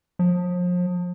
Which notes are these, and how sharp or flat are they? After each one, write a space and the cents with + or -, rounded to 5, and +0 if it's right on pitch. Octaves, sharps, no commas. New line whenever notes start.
F3 +35